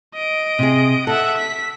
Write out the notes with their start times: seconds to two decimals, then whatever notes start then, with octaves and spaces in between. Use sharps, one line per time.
0.15 D#5 D7
0.59 C3 G#4
1.07 A4 E5 F#5
1.38 B6